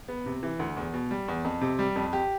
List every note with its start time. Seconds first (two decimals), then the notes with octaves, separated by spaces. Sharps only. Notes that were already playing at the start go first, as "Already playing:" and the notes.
0.08 B3
0.26 C3
0.43 E3
0.59 D2
0.77 E2
0.94 B2
1.11 G3
1.28 E2
1.45 F2
1.61 C3
1.79 G3
1.96 F2
2.13 G4